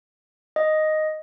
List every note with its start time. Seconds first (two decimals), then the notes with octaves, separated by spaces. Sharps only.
0.56 D#5